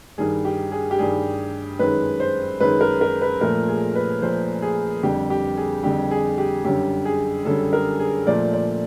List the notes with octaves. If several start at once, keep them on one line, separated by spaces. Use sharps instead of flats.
G2 D#3 G3 G#4
G4
G#4
G4
G2 D#3 G3 G#4
F#2 D#3 G#3 B4
C5
F#2 D#3 G#3 B4
A#4
A#4
B4
A#2 F3 A3 A#4
G#4
B4
A#2 F3 A3 C5
G#4
F2 D3 G3 G4
G4
G#4
F2 D3 G3 G4
G#4
G4
F#2 D3 G3 G4
G#4
F#2 D3 G3 A4
A#4
G#4
A#2 F3 A3 D5
D5